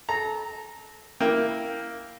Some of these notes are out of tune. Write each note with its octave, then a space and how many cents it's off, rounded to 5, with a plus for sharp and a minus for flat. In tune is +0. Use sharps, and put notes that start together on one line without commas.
A4 -30 A#5 -5
A#3 +0 E4 +0 G5 +0